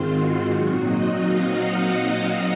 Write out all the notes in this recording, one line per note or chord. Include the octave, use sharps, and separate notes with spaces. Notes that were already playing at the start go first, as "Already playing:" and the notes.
Already playing: G#2 D#3 G#3 C4 F4 C5
F#4
A#2 F#3 C4 D#4 F#4
D#5
F5
F#5
F#5